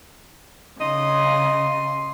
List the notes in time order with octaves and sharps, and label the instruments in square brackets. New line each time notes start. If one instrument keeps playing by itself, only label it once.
[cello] C#3 [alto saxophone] D#5 [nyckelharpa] C6